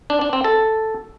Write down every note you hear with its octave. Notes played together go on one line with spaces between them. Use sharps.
D4
D4
C4
A4